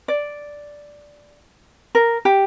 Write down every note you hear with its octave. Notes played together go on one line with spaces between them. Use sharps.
D5
A#4
G4